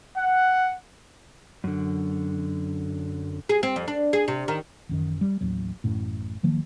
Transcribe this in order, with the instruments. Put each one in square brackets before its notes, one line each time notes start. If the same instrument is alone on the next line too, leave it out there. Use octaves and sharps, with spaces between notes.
[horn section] F#5
[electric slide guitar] F#2 D3
[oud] G#4
C4
F2
D4
G#4
C3
D#3
[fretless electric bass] A1 F#2 D#3
G3
A1 D#2 F#3
A1 F#2 A2
D1 D#3 F3 A#3